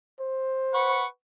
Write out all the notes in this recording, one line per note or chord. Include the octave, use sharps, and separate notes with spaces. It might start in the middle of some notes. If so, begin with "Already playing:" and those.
C5
B4 F#5 C#6